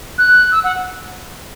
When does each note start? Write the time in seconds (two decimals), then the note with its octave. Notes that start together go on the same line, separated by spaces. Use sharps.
0.18 F#6
0.52 E6
0.64 F#5